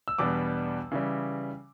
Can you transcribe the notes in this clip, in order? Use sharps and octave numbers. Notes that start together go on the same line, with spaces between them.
E6
E2 B2 G3 B3 D4 D6
C#3 E3 G3